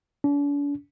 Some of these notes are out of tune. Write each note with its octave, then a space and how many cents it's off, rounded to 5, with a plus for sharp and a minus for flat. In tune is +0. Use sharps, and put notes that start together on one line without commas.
D4 -45